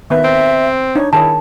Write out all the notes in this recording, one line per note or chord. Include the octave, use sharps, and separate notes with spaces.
D#3 B3 B4 E5
C4
D4 D#4 C#5
D#3 E4 G#4 C#5 A5